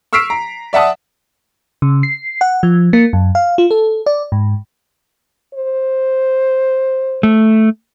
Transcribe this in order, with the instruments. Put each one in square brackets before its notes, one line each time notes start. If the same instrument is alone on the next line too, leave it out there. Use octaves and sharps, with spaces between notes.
[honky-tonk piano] C#6 E6 F6 B6 C7 D7
A#5
D5 E5 F#5 A5 D#6
[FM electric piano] C#3
C7
F#5
F3
A#3
F#2
F5
F4
A4
D5
G#2
[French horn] C5
[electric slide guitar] A3